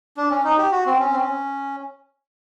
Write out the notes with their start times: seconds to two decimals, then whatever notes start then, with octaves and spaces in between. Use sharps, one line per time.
0.17 D4
0.30 C#4
0.44 D#4
0.58 G4
0.72 F#4
0.86 C4
1.00 C#4
1.12 C4
1.20 C#4